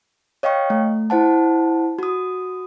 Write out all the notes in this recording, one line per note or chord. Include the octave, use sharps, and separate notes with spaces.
C#5 D#5 F5 G5 C#6
A3
E4 C5 F#5 A5
F#4 D#6